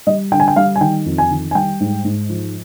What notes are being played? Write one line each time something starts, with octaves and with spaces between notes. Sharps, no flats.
G3 D#5
D3 G5
G#5
G5
G3 F5
G#5
D#3 G5
F2
G#5
D#3
G#5
G3 G5
G#2
G#2
F3